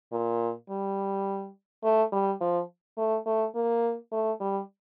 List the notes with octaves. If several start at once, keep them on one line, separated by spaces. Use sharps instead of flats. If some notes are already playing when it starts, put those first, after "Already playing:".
A#2
G3
A3
G3
F3
A3
A3
A#3
A3
G3